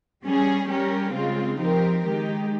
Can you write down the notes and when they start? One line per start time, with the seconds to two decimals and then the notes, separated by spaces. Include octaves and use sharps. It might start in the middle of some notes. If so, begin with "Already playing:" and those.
0.24 G3 C#4 G#4
0.69 G3 C#4 G4 A#4
1.14 C#3 G#3 C4 F4
1.59 F3 C4 D#4 G4 A#4
2.04 D#3 G#3 D#4 G4